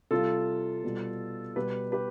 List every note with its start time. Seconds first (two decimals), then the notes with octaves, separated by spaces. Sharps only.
0.11 C3 G3 F4 A4
0.84 B2 G3
1.56 B2 G3 G4 B4
1.92 G4 B4